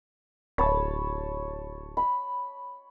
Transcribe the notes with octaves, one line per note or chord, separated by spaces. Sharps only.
D1 C#5 A5 B5
B5